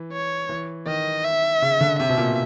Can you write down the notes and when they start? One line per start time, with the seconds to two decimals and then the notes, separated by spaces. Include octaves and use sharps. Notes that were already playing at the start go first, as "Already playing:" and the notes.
Already playing: E3
0.12 C#5
0.49 E3
0.86 D#3 D#5
1.24 E5
1.62 C#3
1.81 D3
1.99 C3 E5
2.09 B2
2.18 A#2